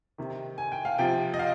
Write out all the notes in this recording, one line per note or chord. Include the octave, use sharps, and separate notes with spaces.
C3 D#3
G#5
G5
F5
C3 F3 G5
D#5
F5